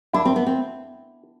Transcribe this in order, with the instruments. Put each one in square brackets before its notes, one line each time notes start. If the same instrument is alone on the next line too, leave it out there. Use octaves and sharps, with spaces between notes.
[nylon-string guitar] D4 [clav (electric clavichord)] E4
[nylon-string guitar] C4
B3
C4